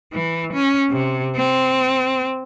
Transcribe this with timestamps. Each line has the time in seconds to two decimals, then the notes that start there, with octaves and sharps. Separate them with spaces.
0.13 E3
0.54 C#4
0.91 C3
1.36 C4